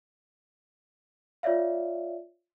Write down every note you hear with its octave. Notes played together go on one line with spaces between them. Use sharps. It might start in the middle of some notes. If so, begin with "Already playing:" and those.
F4 C#5 D5 E5 F5